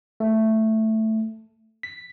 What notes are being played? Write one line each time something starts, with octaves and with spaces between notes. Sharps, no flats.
A3
B6